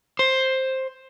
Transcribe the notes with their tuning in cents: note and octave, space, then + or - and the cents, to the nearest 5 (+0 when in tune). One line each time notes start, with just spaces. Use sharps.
C5 +10